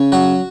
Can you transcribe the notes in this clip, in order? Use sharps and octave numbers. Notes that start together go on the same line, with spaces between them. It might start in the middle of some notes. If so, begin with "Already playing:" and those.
Already playing: C#3 C#4
F#3 F#4